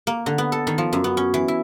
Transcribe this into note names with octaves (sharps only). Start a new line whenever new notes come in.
A#3
D3
B3
A4
D#3
F3
F#2
B3
C#4
E3
E4